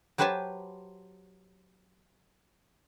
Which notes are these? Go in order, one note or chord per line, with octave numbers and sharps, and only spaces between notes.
F#3 G4 B4 C5 G#5 A5